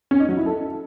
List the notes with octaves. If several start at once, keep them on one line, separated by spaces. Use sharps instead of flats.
C#4
D#4
F#3
E4
A4